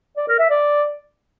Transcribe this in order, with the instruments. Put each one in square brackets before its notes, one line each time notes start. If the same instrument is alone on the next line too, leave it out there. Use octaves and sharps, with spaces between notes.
[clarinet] D5
A#4
E5
D5